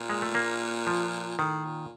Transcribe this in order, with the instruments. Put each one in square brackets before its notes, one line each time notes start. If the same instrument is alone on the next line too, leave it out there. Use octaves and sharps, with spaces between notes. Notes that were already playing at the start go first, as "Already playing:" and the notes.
Already playing: [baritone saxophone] A#2
[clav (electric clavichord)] G#3
A3
A#3
F3
[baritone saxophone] A2 [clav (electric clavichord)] D#3
[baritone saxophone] A#2